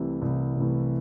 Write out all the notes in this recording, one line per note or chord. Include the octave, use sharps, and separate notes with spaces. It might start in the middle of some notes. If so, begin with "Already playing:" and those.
Already playing: C2 C3 E3 A3
C2
C3 E3 A3